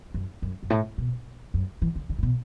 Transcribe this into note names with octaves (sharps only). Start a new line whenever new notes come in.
F#2
F#2
F#2
A2
B2
F#2
E3
D3
D3
A2
B2